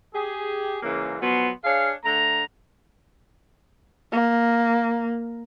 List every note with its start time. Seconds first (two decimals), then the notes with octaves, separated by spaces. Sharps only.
0.14 G4 G#4
0.83 G#2 C#3 E3 A#3
1.22 B2 F3 F#3 B3 C6
1.64 D4 G#4 C#5 F5
2.04 D3 A3 A#5
4.12 A#3